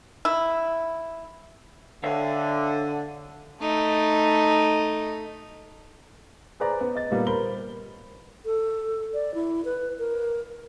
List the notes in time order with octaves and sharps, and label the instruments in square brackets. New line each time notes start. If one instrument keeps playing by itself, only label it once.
[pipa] E4
[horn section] D3 [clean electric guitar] C#5 E5 F5
[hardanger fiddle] A3 D#4
[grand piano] G#4 B4 C5 D5 A#5
B3
D#5 A6
A#2 G3 A#3 B3
A#4 C5 B5 G7
[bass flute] A4
D5
E4
B4
A#4